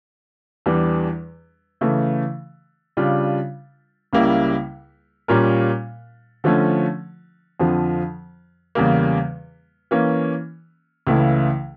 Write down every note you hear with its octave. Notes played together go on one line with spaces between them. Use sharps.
E2 E3 G3 D4
C#3 E3 A3
C#3 G3 D4 F4
C#2 C#3 G3 A#3 E4
A#2 G3 C#4 F4 A#4
D3 F3 A3 C#4
F2 D3 F3
E2 C#3 G3 A#3
E3 A#3 C#4
C#2 C#3 E3 A3 E4